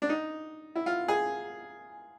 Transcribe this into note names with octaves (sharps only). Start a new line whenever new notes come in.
D4
D#4
E4
F4
G#4